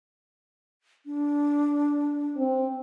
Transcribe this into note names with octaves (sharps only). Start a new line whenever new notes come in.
D4
C4